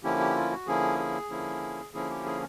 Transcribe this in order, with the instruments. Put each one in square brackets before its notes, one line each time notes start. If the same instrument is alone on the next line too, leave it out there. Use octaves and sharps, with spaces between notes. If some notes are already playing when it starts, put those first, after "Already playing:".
[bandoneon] D3 F3 A#3 C#4 E4 G4
G4
F4
F#4
D3 F3 A#3 C#4 E4 G#4
G#4
D3 F3 A#3 C#4 E4
D3 F3 A#3 C#4 E4 G#4
G4
G#4